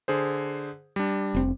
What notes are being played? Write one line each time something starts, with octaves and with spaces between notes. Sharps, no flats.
D3 G#4 C5
G3 D4
F1 C4